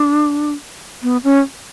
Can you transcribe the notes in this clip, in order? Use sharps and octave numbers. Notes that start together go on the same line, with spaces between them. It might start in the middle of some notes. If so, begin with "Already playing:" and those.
Already playing: D4
B3
C#4